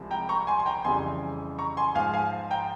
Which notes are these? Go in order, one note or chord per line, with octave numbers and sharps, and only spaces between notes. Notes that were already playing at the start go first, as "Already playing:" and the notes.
Already playing: C2 C3 F3 G#3
G5 A#5
A#5 C#6
G#5 C6
C6
G5 A#5
F2 C#3 E3 G3 G#5 C6
A#5 C#6
G#5 C6
G#2 F3 G#3 F5 G#5
F5 G#5
G5 A#5